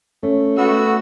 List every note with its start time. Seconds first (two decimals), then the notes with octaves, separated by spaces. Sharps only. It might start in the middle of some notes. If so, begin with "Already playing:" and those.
0.23 A3 C#4
0.58 A3 B3 F#4 E6